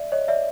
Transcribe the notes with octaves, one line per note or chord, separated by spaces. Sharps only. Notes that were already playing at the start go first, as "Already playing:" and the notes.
Already playing: D5 E5
C#5 D#5
D5 E5